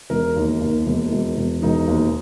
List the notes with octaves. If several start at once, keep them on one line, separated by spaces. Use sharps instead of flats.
E1 A#4
D#2
D#2
E1
E1
E1
E1 D#4
D#2